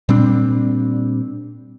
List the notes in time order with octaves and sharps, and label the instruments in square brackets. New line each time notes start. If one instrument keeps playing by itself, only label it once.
[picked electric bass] A#2 G3 C4 D4